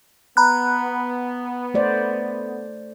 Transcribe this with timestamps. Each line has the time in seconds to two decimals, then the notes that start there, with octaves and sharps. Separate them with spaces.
0.37 B3 A#5 B5 F#6
1.74 A3 C5 D5